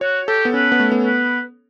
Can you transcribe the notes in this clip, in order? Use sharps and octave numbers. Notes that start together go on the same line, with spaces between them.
F#4 C#5
G4 A4
B3
C#4 B4
B3
A3
B3
B4